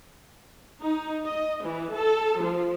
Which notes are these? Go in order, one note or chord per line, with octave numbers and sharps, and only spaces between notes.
D#4
D#5
E3
A4
F3